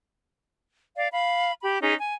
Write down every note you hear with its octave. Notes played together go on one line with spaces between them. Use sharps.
D5 F5
F5 B5
G4 B5
C#4 D#4 G#4
G#5